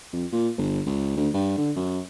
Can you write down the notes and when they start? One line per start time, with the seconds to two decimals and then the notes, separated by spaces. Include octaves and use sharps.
0.13 F2
0.32 A#2
0.58 G1
0.86 C#2
1.17 D2
1.34 G2
1.58 D3
1.76 F#2